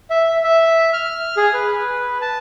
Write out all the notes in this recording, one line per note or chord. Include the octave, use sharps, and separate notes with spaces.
E5
E5
F6
G#4
B4
A5